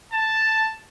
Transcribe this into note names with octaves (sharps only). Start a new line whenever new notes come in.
A5